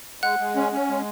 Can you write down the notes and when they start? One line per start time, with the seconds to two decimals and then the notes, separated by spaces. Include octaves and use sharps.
0.22 G#3 F#5 F#6
0.39 G#3
0.56 C#4
0.72 C#4
0.89 G#3